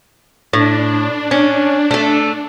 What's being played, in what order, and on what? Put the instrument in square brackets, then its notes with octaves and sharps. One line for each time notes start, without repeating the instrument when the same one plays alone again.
[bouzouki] A2 [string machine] D4
[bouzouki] C#4
A3 A4